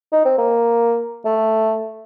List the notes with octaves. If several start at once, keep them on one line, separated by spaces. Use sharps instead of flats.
D#4
C4
A#3
A3